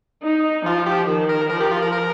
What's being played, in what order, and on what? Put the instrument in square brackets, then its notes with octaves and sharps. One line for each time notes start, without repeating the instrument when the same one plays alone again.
[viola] D#4
[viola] F3 [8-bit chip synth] F4
[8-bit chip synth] G4
[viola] D#3
[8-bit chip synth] A#4
[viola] F3 [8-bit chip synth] A#4
[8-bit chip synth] G4
F4
A#4
A#4